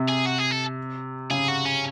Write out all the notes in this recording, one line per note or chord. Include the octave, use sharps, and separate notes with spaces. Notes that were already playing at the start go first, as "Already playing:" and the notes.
Already playing: C3
G#4
F#4
G#4
A4
C#3 G#4
F#4
C#4